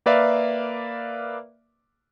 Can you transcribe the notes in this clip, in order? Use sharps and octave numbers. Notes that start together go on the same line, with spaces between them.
A#3 A#4 B4 D5 E5 F5